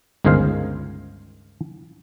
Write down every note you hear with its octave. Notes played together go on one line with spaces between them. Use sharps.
G1 C#2 D#3 G#4 C5 F5